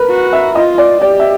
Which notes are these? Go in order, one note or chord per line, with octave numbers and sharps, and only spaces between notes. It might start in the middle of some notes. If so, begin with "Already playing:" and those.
Already playing: A#4 B4
F#4
E5
F4 D#5
D5
G4 D5
E5